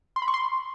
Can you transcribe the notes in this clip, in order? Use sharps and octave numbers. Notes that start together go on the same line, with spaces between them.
C6
B5
C#6
C6